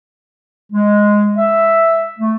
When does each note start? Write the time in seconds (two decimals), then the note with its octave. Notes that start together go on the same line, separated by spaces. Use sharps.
0.72 G#3
1.36 E5
2.19 A3